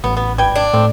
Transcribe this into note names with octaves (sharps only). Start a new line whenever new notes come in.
A1 B3
B3
G#1 G3 B4 G5 G#6
D4
A2 C4